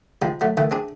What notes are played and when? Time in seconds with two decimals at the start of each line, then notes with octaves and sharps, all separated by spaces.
0.22 F3 G3 G#3 D#4
0.41 F#3 A3
0.57 D#3 E3 A3
0.71 C4 D4 G#4